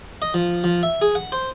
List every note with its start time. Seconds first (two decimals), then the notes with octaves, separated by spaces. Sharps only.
0.22 D#5
0.34 F3
0.64 F3
0.83 E5
1.02 G#4
1.15 F#5
1.32 C5